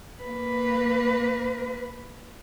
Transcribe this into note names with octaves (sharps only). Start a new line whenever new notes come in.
A#3 B4